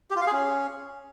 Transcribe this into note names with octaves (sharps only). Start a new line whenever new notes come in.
G4
F4
F5
G#4
C#4